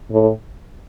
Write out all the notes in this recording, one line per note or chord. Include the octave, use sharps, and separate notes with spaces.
A2